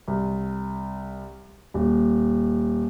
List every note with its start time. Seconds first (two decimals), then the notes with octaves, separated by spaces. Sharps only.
0.08 C2
1.74 D#1